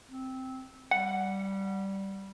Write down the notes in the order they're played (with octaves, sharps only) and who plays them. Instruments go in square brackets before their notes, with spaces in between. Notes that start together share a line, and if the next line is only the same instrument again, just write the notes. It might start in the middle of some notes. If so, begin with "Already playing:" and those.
[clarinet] C4
[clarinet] G3 [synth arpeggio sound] F#5